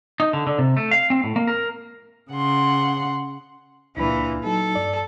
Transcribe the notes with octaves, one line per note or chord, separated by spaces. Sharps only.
D#4
D3
D3
C3
A3
F5
C4
A2
A#3
A#4
C#3 F#5 C6
C#2 A#2 E3 D4 B5
F#3 D#4 A4
G2 D5